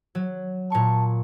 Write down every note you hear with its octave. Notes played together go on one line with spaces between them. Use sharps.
F#3
A#2 A5 C#6